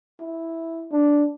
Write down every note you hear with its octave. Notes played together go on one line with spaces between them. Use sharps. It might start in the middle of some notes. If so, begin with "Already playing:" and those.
E4
D4